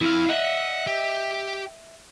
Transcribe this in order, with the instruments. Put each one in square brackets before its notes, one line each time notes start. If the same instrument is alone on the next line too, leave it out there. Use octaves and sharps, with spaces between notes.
[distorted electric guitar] F2 F5 [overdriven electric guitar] E4
[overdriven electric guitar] D#5 E5 [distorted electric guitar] F#5
[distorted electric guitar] G4